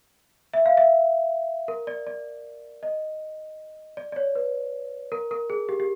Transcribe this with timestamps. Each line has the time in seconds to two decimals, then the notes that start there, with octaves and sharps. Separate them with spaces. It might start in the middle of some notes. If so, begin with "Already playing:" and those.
0.54 E5
0.66 F5
0.77 E5
1.68 A#4
1.87 D5
2.07 D5
2.83 D#5
3.97 D5
4.12 D5
4.16 C#5
4.35 B4
5.12 A#4
5.31 A#4
5.50 G#4
5.69 G4
5.80 G4